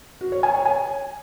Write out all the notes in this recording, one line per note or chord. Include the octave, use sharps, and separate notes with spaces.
F#4
C#5
G#5
C#5
G#5